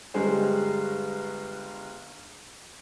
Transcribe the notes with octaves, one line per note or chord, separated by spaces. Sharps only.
G1 G3 G#3 G#4 C5